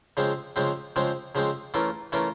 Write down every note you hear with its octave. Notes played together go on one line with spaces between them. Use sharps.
C#3 F3 G#3 C4
C#3 F3 G#3 C4
C#3 F3 G#3 C4
C#3 F3 G#3 C4
E3 A3 C#4 F4 A#4
E3 A3 C#4 F4 A#4